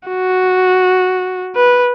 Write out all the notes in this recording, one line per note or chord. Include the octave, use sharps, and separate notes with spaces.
F#4
B4